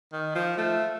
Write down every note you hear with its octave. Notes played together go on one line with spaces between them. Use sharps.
D#3
F3
A3